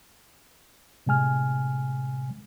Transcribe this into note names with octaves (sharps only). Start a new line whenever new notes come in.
A2 C3 G#3 G#5 F6